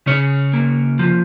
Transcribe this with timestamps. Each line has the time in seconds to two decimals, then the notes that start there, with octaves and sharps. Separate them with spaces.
0.06 C#3 C#4 C#5
0.53 A#3
0.99 F3